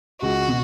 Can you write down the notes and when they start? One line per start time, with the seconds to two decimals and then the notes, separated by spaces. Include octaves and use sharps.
0.22 C#2 F#4
0.48 B2